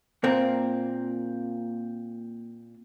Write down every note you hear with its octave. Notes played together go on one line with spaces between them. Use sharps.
A#2 A#3 C4